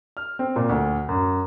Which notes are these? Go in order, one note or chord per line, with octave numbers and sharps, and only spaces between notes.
F6
C4
A#2
D2
F#2